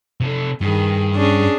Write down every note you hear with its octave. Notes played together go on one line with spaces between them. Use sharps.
C3 A4
G2 D#3 G#4
C#4 D4 G#4